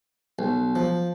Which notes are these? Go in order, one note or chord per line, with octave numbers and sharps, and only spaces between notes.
B1
F3